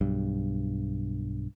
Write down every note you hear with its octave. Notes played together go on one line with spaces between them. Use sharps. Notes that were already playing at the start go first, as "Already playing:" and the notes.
B1 G2